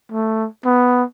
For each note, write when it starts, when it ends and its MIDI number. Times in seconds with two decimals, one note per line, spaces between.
0.12 0.47 57
0.65 1.04 59